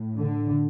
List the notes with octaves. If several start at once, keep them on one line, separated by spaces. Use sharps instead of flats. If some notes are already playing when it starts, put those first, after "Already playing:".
Already playing: A2
D3